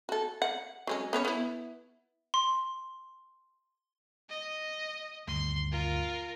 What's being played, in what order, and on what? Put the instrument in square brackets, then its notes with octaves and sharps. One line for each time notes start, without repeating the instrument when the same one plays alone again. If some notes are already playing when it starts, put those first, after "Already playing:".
[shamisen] F#4 A4
F#5
F#3 G#3 C#4
B3 C#4 C#5
B3 E4
[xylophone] C6
[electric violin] D#5
[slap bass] D2 G2 D#3 [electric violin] C6
[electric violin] F4 A#4